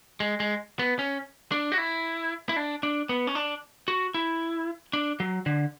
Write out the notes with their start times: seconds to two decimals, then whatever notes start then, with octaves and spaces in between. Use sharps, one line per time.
0.20 G#3
0.40 G#3
0.79 B3
0.99 C#4
1.52 D4
1.72 F#4
1.78 E4
2.49 E4
2.56 D4
2.83 D4
3.09 B3
3.27 C#4
3.35 D4
3.88 F#4
4.15 E4
4.93 D4
5.20 F#3
5.46 D3